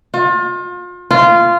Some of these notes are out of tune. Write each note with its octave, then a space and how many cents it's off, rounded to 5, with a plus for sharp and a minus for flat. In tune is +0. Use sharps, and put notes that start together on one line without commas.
F4 +35
F4 -15